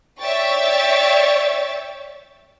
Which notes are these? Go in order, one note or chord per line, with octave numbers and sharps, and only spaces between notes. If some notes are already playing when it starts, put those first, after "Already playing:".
C#5 D5 E5 G5 C#6 A6